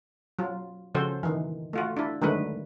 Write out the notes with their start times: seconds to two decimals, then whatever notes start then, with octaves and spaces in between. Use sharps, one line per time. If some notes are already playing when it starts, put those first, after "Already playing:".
0.39 F#3 F4
0.95 C#3 F3 F#4 A4 C5
1.23 D#3 E3
1.73 A3 F4 F#4
1.97 D4 E4
2.22 D3 D#3 F#3 G#3 A3 B4